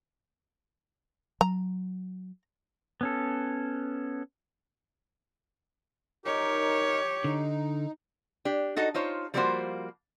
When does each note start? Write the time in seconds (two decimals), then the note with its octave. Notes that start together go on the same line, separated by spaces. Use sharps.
1.41 F#3 A#5
3.01 B3 C#4 A4
6.26 D#4 G4 A#4 C#5
7.24 D3 D#4
8.45 D4 G4
8.76 D#4 F#4 A4 D#5
8.94 D#4 F4 C5 C#5
9.34 F3 G3 A#3 F4 F#4 C5